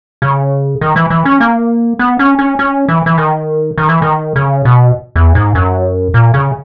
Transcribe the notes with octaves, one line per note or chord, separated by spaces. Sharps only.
C#3
D#3
E3
E3
C#4
A#3
B3
C#4
C#4
C#4
E3
E3
D#3
D#3
E3
D#3
C#3
B2
E2
G#2
F#2
A#2
C#3